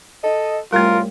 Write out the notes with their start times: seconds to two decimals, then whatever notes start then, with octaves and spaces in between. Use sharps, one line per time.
0.24 A4 D#5
0.73 C2 F#2 G3 A3 F4 A#4